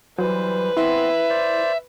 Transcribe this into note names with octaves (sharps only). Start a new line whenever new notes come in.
E3 F#3 G3 B4 C5
B3 C4 E4 E5 C6
C5 D5